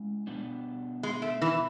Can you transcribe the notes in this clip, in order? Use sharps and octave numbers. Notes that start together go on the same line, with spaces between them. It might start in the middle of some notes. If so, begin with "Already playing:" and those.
Already playing: G#3 C#4 E4
B2 G3 B3 D4
G#3
A3
E3